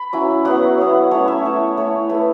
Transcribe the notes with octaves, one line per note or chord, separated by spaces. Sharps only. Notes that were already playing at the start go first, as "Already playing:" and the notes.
Already playing: B5
F#3 C#4 E4
F#3 B3 E4 F#5
F#3 B3 E4
A3 C#4 E4 C#5
E5
A3 C#4 E4
A3 E4 C#5
A3 E4 B4